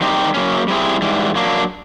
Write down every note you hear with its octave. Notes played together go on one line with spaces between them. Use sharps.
D#3 G3 C4 D#4 G4
F#3 A#3 C#4
G3 C4 E4 G#4
G#2 E3 G3
F#3 A#3 D4